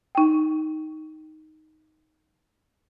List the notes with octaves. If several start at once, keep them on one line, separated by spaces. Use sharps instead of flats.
D#4 G5